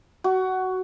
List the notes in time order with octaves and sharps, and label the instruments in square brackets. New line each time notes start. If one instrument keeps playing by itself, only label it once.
[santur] F#4